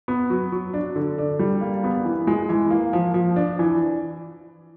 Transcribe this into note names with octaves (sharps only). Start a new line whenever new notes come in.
B3
F#3
F#3
D4
D3
D4
G3
A#3
B3
E3
G#3
E3
A#3
F3
F3
D4
E3